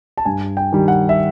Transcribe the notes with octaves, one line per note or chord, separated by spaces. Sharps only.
A5
G2 G#5
G5
D#3 G3
F#5
E5